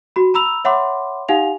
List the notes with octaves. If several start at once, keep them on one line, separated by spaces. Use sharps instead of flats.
F#4 B5
A#5 B5 E6 F7
C#5 E5 F#5 B5 C6 D6
D#4 G4 F5 F#5 G#5 F7